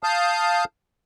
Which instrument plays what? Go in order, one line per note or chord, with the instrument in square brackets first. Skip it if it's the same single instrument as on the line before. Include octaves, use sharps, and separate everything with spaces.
[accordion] F5 A5 D#6 F6 G6